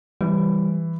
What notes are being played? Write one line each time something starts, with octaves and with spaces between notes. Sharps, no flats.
E3 G3